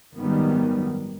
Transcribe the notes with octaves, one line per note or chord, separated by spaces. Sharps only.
G#1 F#2 D#3 G3 B3